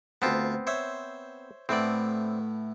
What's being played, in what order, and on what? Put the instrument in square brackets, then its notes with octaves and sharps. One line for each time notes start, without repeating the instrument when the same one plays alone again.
[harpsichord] D2 F4 A5 [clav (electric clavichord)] B3 C4
[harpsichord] C5 C#5 E5
[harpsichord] A2 A3 B3 [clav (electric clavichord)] C4 D5